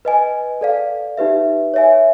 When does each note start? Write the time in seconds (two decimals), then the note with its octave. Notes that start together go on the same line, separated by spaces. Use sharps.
0.05 B4 D#5 G#5
0.61 A4 D5 F5
1.18 D#4 G4 B4 E5
1.74 C#5 E5 G#5